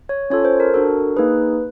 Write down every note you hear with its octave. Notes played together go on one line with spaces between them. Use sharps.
C#5
C#4 F4 A4 C#5
C5
A#4
D4 F#4 A4 A#4
A#3 D#4 G#4 B4